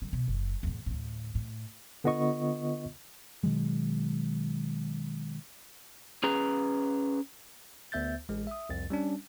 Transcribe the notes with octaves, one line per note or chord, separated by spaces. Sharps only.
D3 G3
B2
F#1
E2 A2
D2 A2
A2
D3 B3 F4 D#5 C#6
B2 D#3 F#3 G#3
C#4 G#4 B4 A#5
D2 B3 E5 G6 A6
A1 G#3
E5 D#6
C2 F2 A6
G3 C#4 D4